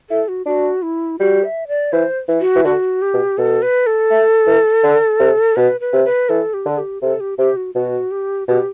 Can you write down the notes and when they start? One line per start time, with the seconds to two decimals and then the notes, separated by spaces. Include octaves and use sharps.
0.10 E4 A4
0.28 F#4
0.46 D4 F#4
0.82 E4
1.19 G3 F#4
1.44 E5
1.68 D5
1.92 E3 C5
2.28 E3
2.41 F#4
2.56 E3
2.65 D3 F#4
3.02 G4
3.14 B2
3.38 B2 A4
3.62 B4
3.86 A4
4.11 A3
4.47 E3
4.84 D3
5.20 C3
5.56 B2 B4
5.80 B4
5.93 C3
6.05 B4
6.29 E3 A4
6.54 G4
6.66 D3 A4
6.78 G4
7.02 C3 A4
7.20 G4
7.38 C3 G4
7.56 F#4
7.75 B2 F#4
8.11 G4
8.48 B2 G4